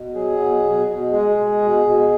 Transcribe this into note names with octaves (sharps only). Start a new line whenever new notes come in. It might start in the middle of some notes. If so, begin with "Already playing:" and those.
Already playing: B2
F#3 G#4
B2
B2
B2
G#3 G#4
G#3
B2
B2